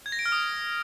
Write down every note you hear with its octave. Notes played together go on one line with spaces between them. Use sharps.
G#6
A#6
D7
F6
D#6